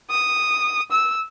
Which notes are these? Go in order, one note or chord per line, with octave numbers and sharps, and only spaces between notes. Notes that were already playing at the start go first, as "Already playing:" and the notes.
D#6
E6